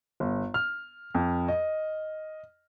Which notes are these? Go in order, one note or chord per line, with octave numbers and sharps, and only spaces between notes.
G1
F6
F2
D#5